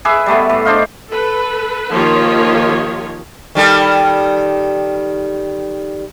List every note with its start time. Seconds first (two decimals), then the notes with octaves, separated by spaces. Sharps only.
0.05 G#4 B4 E5 D6
0.26 G3 A3 B3
0.49 A2
0.65 D4 C5 D#5 F5
1.08 A4 B4
1.92 D#3 F3 A#3 F4 G4 C#5
3.55 D#3 G3 A4